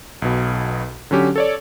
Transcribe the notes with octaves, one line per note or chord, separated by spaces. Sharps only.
B1 B2
D3 F#3 C#4 G4
A4 C#5 D5